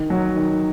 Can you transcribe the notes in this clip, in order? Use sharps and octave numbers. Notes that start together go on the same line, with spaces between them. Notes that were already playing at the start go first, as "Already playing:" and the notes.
Already playing: D#3
F#3
D#3